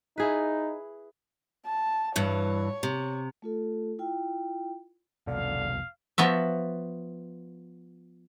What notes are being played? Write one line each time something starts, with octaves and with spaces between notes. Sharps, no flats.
D#4 E4 G#4 B4
A5
G2 E3 C#5
C3
A3 F4 A4
E4 F4 G5
F1 C2 B2 D3 F5
F3 B3 F#4 E5